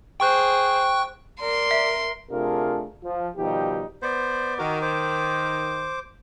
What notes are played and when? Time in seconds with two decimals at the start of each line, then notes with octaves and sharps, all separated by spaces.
0.20 G#4 C5 G5 C#6 F#6
1.40 A#4 D5 C6
1.71 E5
2.31 C3 A3 D4 F4 G#4 A#4
3.04 F3
3.37 B2 D#3 F3 G3 D#4 G4
4.02 B3 C5 D5
4.59 D#3 F#4 A#4 D6
4.82 C5 D6